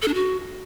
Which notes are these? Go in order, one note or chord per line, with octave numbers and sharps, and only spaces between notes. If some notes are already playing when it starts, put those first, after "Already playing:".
A4
D4
F#4